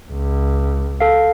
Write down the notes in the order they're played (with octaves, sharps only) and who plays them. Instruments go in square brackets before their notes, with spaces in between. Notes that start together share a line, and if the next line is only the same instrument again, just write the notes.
[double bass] C#2
[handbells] A4 F5